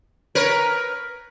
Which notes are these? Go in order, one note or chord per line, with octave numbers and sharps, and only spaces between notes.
A#4 B4 C#5